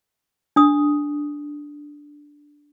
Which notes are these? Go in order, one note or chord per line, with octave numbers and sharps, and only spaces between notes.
D4 D#6